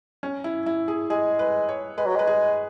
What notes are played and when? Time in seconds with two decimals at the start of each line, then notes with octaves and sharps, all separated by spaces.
0.23 C#4
0.44 E4
0.66 E4
0.88 G#4
1.10 G#3 G#4
1.39 B4
1.69 C#5
1.98 G#3 B4
2.06 F#3
2.15 G#3 B4
2.27 G#4